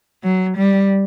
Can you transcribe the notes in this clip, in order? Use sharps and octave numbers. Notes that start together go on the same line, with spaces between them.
F#3
G3